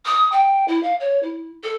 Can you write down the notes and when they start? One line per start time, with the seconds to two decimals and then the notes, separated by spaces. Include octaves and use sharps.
0.06 D#6
0.32 G5
0.68 E4
0.83 F5
1.00 C#5
1.23 E4
1.64 A4